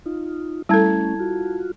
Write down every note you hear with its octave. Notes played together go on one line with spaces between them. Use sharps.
D#4 F4
G3 A3 C#4 E4 A4 A5 G#6
F4 F#4